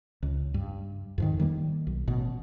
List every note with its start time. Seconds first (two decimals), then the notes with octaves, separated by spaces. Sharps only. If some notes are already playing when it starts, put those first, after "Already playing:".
0.23 C#2
0.54 G2
1.18 F2 G#2 D#3
1.39 D#3 G3 A#3
1.87 B1
2.07 A1 B2